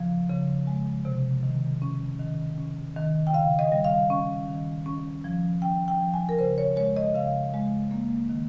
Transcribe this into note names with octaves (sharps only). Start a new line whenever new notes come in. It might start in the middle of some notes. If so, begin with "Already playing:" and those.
Already playing: C#3 F3
C#3
G#3
C3
D#3
C#4
D#3
C#4
D#3
G5
C#3 F5
D#5
G3
F5
C#4
D#3
C#4
F3
C#4 G5
G5
F3
G#5
A#4
C#3 C5
C#5
G#3 C#5
D#5
C#3 F5
G#3
A#3
D#3